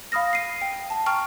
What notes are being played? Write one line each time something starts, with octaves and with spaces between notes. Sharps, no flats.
F5 B5 D#6 F6 A#6
C7 D#7
G5
A5
G5 A#5 C#6 F6